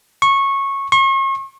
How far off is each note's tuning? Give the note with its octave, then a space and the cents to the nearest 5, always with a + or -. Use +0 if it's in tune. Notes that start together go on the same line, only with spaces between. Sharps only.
C#6 -15
C#6 -40